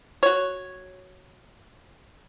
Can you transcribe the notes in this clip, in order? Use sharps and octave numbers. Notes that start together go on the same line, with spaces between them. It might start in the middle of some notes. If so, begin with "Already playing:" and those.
F#4 C#5